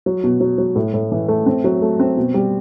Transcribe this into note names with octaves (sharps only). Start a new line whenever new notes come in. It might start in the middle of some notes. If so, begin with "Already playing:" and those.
F#3
B2
F#3
F#3
A2
A2
E3
A3
C4
F#3
A3
C4
B2
G3